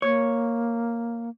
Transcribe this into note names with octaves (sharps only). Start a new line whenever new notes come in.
A#3 C#5